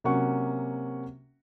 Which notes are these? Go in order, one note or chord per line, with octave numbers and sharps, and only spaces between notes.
C3 F#3 A#3 C#4 F#5 C#6